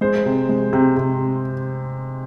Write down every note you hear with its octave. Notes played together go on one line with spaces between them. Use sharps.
G#3 C5
C3
G#3
C3
C3